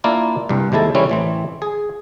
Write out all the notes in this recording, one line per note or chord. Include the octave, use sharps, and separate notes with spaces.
A#3 D4 E4 F4 A#4 D5
C2 G2
D#2 C3 G#3 E4 A4
E3 G3 C4 C#4 E4
A1 E3 C4
G#4